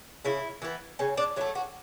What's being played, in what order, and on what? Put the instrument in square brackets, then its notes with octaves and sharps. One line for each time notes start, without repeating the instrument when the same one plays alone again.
[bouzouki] C#3 E4
E3 B3
C#3 C#4
D4
F#3 E4
A3
F#4